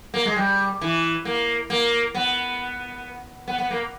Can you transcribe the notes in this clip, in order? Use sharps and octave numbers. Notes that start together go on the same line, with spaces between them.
A#3
G#3
G3
E3
A#3
A#3
B3
B3
B3
A#3